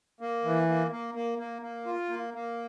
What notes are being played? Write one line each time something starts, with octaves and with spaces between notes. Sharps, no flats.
A#3
E3
A#3
A#3
A#3
A#3
A#3
F4
A#3
A#3